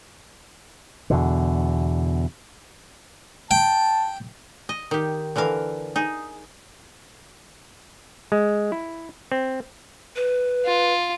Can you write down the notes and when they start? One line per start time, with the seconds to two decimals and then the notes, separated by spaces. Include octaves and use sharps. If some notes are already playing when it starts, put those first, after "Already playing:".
1.10 E2 B2 D3
3.51 G5 A5
4.69 D#5
4.91 D#3 G4
5.36 D3 E3 A#4 F5
5.96 D#4 G#4
8.32 G#3
8.72 E4
9.32 C4
10.16 B4
10.65 F4